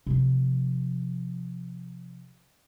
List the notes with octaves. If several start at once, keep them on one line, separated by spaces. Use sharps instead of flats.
C3 F3